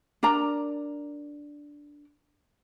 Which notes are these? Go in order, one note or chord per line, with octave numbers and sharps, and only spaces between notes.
D4 A#4 D5 A#5